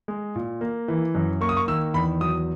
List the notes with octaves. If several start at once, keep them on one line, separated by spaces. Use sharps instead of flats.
G#3
A#2
A#3
E3
F#2
A#3 C#6
D#6
C#6
D#3 E6
E2 B5
F#3 D#6